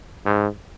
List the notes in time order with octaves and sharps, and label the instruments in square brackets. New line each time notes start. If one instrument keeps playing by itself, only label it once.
[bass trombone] G#2